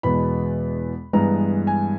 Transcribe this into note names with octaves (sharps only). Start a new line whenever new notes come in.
E2 B2 G#3 B3 B5
G2 E3 G#3 B3 A#5
G#5